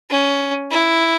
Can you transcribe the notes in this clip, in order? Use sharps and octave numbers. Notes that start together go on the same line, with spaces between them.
C#4
E4